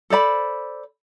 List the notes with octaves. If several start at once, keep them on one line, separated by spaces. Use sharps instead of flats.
A4 C5 D5 B5